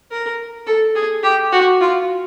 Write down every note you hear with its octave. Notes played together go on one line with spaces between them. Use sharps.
A#4
A4
G#4
G4
F#4
F4